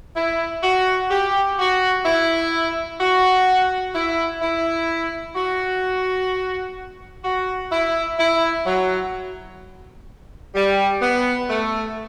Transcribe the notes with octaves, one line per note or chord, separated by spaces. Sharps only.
E4
F#4
G4
F#4
E4
F#4
E4
E4
F#4
F#4
E4
E4
F#3
G3
B3
A3